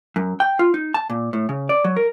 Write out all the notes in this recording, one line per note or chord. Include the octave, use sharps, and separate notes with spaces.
F#2
G5
F4
D#4
A5
A#2
A2
C#3
D5
F#3
A#4